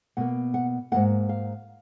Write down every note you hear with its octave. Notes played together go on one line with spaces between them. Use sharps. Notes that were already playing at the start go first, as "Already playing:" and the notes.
B2 A#3 F#5
F#5
G#2 D#3 A#3 F#5
F5